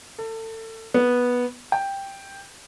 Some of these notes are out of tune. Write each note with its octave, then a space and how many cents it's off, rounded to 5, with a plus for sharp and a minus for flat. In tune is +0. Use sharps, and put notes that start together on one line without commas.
A4 +30
B3 -10
G5 +5